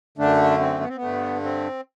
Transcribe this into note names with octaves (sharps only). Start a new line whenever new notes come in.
F#2 D3 A3 D4
C4
B3
C4
B3
G2 D3 A3
C4